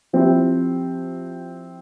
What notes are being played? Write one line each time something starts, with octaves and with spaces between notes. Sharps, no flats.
F3 C4 E4 G4